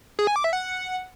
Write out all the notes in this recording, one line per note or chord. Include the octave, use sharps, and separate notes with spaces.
G#4
G#5
D6
E5
F#5